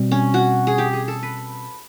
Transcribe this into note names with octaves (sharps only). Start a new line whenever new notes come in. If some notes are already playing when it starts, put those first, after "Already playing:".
Already playing: B2 G3 C4
C#4
F#4
G#4
G4
G#4
A4
B4